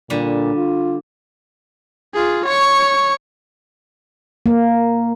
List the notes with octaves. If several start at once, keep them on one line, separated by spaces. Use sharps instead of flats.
A#2 D3 G3
F4
F4 G#4
C#5 C#6
A#3